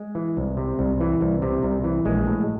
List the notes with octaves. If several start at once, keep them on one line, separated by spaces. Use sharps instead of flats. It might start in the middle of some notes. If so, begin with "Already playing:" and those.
Already playing: G#3
E3
C2
C3
C2
E3
C2
C3
C2
E3
A#1 G#3
A2